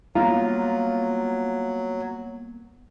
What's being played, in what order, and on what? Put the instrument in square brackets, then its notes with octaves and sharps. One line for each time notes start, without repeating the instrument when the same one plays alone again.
[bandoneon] F#3 [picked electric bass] G3 A#3 B3 [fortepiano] F4 A#5